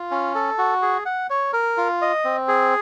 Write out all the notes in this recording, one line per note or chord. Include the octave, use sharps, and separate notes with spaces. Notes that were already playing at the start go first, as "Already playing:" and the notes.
Already playing: F4
C#4
A4
F#4
G#4
F#5
C#5
A#4
F4
D#5
C4
G#4